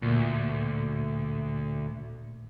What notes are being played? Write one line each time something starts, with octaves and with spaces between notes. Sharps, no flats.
D2 A#2